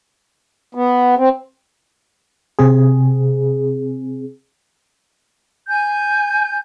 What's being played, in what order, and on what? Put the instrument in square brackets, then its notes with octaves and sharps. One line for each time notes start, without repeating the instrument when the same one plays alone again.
[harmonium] B3
C4
[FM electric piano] C3 C4 G#4
[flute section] G#5 G6